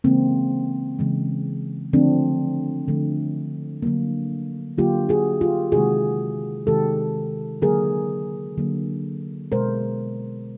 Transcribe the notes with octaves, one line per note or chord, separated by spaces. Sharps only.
C#3 E3 G#3 A#3 C4
C#3 E3 G#3
D3 F3 A3 C4 D4
D3 F3 A3
D3 F#3 A#3
D3 F#3 A#3 F4 G4
F#4 G#4
F4 G4
C3 D#3 G#3 F#4 G#4
C3 D#3 G#3 G4 A4
D3 F#3 A#3 G#4 A#4
D3 F#3 A#3
B2 G#3 A#4 C5